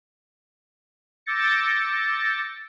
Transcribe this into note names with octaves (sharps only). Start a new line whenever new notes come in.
D6 E6 G6 A6 A#6 C#7